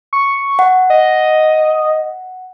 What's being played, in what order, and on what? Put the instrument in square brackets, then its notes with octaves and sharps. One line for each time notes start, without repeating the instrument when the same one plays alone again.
[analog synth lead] C#6
[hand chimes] F#5
[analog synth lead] D#5